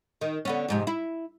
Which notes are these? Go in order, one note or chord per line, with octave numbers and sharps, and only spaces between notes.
D#3
D3 B3 C#4
F2 G#2 C3
E4